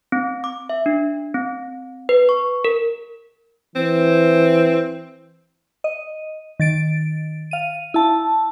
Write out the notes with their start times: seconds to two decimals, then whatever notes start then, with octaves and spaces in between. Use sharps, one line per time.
0.12 C4
0.44 D6
0.70 E5
0.86 D4
1.34 C4
2.09 B4
2.29 C#6
2.65 A#4
3.76 E3 C4
5.84 D#5
6.60 D#3 A6 D7
7.51 F5 D#7
7.94 E4 A5